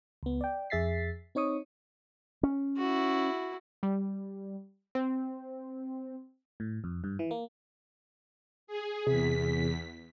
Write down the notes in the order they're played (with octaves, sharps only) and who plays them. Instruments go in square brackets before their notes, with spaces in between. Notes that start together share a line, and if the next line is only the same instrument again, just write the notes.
[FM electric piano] C#2 B3
D5 G5
F2 G#4 E5 A6 B6 C7
C4 D#4 C#5 C#6 D#6
[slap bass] C#4
[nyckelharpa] E4 F#4
[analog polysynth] G3
C4
[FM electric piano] A2
F2
G2
E3
A#3
[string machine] G#4
[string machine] E2 B6 [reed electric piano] C3 G#4